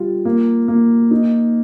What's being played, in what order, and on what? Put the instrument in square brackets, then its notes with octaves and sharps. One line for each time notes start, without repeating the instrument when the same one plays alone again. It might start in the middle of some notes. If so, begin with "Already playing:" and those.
Already playing: [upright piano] G3 F4
A#3
A#3
D#4